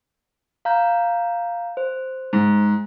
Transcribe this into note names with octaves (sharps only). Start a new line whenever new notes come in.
F5 A#5 G6
C5
G#2